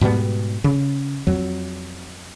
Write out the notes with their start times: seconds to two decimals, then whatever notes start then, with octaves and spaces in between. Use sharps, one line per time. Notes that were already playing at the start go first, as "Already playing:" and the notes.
0.01 G#2 B2 G3 B3
0.64 C#3
1.27 F2 F#3